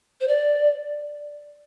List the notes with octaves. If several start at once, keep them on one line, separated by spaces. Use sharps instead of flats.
C5
D5